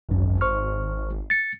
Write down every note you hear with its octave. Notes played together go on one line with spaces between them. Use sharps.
G#1 C#2 F#2
C5 C#6 F6
A6 C#7